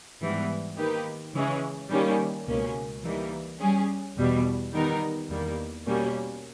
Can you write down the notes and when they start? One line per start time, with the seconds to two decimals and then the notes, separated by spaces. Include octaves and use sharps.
0.21 G#2 E3 G3 B3
0.77 D#3 A#3 D#4 G4 B4
1.33 C#3 E3 G#3 C#4
1.90 D#3 G3 A#3 C#4
2.47 C#2 B2 A#3 C#4
3.03 E3 G3 A#3 D#4
3.60 G3 C#4 G#4
4.17 E2 B2 G3
4.73 D#3 G3 B3 D#4 A#4
5.29 E2 D#3 G3 A#3
5.86 B2 G3 A#3 C#4